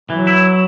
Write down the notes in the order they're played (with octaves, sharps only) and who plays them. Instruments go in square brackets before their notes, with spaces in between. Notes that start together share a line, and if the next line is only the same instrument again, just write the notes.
[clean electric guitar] E3 [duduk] F#3
[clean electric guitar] E4